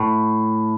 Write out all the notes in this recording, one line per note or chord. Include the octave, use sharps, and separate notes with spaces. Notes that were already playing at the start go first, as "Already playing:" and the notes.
Already playing: A2